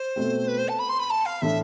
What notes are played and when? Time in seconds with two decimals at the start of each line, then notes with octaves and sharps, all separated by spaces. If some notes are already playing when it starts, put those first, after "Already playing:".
Already playing: C5
0.16 B2 A3 C4
0.47 B4
0.58 C5
0.68 A5
0.79 B5
0.89 C6
0.99 B5
1.10 A5
1.25 F5
1.41 A2 E3 A3 D4 A4 E5